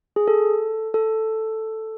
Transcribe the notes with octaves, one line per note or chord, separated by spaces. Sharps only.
G#4
A4
A4